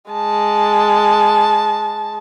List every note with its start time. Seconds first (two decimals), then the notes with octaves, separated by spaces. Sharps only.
0.11 G#3 A5